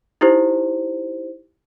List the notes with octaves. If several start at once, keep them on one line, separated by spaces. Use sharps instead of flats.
D#4 E4 G4 C5